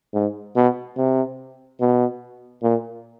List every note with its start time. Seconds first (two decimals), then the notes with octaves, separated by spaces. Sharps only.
0.14 G#2
0.56 B2
0.97 C3
1.81 B2
2.63 A#2